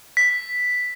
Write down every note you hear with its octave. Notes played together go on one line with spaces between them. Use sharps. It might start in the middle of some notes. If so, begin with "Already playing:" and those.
B6